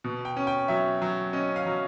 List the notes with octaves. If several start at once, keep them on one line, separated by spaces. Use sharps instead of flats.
B2
G5
C#4
G5
F#3 E5
F#3
C#4 D#5
F5
F#3